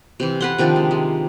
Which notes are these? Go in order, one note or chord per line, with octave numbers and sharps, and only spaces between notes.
C3 E3
B4 F#5 C6
C3 D#3 F3 D4
G#3
G#3